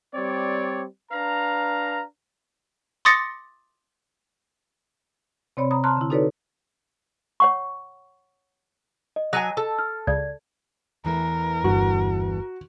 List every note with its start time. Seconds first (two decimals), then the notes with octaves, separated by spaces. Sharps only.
0.14 G3 C4 C#5 D5
1.11 D4 B4 F5 A#5
3.05 C6 D6 D#6 A6 A#6 C#7
5.57 C3 C4 C#5 D5 B5
5.71 A#5 B5 D#6
5.84 A5 A#5 C6 F6 F#6
5.97 D3 E4
6.10 D#4 F#4 A4 B4 C#5 D5
7.40 C#5 F#5 C#6
9.16 D#5
9.33 F#3 F#5 G#5 A#5 D#6
9.57 A4
9.79 F6
10.07 C#2 D5 G#6
11.05 E2 E3 A3 A#4
11.64 G1 G2 F#4